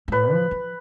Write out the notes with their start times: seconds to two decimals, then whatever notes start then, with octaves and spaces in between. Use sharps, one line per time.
0.08 G#2
0.12 A2 B4
0.32 F3
0.51 F3